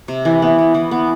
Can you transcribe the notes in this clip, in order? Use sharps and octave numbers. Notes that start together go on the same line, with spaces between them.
C3
E3
B3
B3
E3
B3